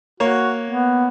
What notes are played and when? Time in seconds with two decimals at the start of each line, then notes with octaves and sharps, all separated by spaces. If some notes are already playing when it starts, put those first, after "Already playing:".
0.20 A#3 F#4 C#5
0.71 B3